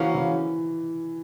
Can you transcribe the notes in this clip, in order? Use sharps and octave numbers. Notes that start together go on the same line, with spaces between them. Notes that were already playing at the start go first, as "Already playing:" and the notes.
Already playing: C#3 E3 F3 A#3 C#4 F#4
E3